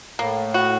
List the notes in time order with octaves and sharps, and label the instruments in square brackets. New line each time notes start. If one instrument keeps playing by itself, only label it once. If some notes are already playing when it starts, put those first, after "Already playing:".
[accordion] A2 [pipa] A#3
[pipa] F#4